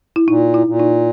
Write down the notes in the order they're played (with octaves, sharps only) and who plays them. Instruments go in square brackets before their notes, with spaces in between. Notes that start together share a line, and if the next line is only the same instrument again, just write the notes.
[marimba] E4
[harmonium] A#2 [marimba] D#4
[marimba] E4
[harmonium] A#2
[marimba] D#4